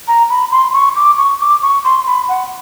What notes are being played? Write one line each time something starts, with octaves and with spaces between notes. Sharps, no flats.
A#5
B5
C6
C#6
D6
C#6
D6
C#6
C6
B5
F#5